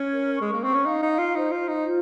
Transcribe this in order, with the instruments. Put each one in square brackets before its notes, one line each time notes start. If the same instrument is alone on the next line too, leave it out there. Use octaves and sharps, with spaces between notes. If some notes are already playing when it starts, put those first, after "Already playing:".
Already playing: [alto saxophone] C#4 [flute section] C#5
[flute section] A#4
[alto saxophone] G#3 [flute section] C#6
[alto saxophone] A#3
[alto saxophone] C4 [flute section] C#6
[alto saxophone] C#4
[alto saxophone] D#4 [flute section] F5
[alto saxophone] D#4
[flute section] F5
[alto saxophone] F4
[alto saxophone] D#4 [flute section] C5
[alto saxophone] F4
[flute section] C5
[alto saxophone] D#4
[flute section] F4